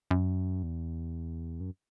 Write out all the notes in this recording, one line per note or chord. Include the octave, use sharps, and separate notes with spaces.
F#2
E2
F#2